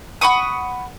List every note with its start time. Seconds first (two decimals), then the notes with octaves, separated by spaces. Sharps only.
0.21 F#5 B5 C#6 D#6